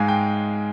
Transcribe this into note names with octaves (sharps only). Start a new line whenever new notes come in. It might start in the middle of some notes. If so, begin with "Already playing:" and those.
Already playing: G#2 G#3 F5 G#5
G5